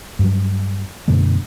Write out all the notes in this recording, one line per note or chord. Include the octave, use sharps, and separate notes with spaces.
G2 F#3
F#2 B2 D3 A3